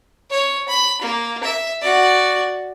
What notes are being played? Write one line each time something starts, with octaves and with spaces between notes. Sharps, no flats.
C#5
B5
A#3
E5
F#4 D5